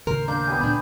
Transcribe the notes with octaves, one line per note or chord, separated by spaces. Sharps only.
D#2 A2 C#3 A#4 C5 C6
A#3 D4 G6
B3 G4 G#5
D2 A#2 B3 D4 B5